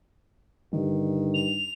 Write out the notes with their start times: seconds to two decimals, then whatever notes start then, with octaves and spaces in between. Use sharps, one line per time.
0.73 G2 D3 D#3
1.34 F7